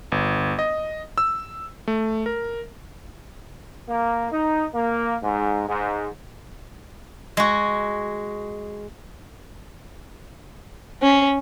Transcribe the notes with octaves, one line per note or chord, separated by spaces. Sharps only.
G1
D#5
E6
A3
A#4
A#3
D#4
A#3
G#2
G#2
G#3 F#4
C#4